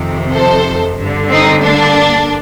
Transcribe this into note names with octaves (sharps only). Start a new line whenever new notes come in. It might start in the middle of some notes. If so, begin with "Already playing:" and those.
Already playing: F2 C3 D#3
A4 C5
G2 D3
C4 D#4
A#3 D4